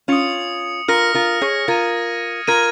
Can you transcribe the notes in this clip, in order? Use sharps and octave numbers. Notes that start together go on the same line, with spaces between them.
C#4 F4 D#6 C#7 F7
F4 A#4 F6 A#6 C#7
F4 A#4
G#4 C#5
F4 A#4 F6 G#6 D#7
F4 A#4 F6 G#6 D#7